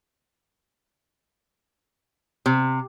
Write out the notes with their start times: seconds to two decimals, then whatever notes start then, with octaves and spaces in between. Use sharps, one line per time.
2.46 C3